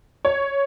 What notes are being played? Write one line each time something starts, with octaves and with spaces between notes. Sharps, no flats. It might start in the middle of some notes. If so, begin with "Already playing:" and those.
C#5